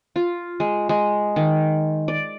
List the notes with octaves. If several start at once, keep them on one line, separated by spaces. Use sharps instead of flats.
F4
G#3
G#3
D#3
D5